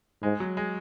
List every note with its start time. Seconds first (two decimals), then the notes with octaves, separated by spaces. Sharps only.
0.23 G#2 G#3
0.40 F#3
0.57 G#3